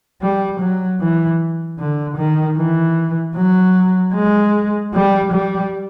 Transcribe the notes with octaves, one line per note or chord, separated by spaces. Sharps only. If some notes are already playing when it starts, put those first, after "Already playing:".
G3
F#3
E3
D3
D#3
E3
F#3
G#3
G3
G3